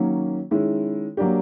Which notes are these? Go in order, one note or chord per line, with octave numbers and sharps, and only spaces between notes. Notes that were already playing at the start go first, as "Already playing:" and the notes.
Already playing: D#3 F#3 A#3 C#4
D#3 G#3 C#4 E4
F#3 A#3 D4 G4